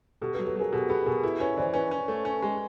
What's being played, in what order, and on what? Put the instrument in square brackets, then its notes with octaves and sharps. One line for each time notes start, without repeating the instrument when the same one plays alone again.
[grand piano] B2 [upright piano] G4 A4
[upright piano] A4 B4
[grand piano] F#3
[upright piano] A4 B4
[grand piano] F#3 [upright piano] G#4 A#4
[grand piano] B2 [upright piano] G4 A4
[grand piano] B3 [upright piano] G4 A4
[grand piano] B2 [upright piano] G#4 A#4
[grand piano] E4 [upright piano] A4 B4
[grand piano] C#4 [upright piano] B4 C#5
[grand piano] E3 [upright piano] C5 D5
[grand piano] C#4 [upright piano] B4 C#5
[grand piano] C#4
A3
C#4
G#3